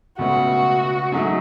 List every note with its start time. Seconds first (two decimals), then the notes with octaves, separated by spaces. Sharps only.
0.19 C#2 B2 A3 C#4 F#4
1.12 G#2 F#3 A3 D#4